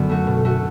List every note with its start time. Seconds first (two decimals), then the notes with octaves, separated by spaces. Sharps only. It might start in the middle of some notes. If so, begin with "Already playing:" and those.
Already playing: F#2 D3 B3
0.09 A3 F#4
0.27 B2
0.45 A3 F#4